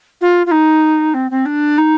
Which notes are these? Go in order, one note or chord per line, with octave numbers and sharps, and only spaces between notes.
F4
F4
D#4
C4
C4
D4
D#4